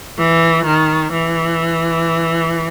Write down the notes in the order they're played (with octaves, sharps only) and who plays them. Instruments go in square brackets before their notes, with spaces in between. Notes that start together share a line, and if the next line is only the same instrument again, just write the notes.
[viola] E3
D#3
E3